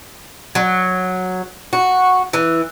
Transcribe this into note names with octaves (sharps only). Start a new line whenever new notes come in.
F#3
F#4
E3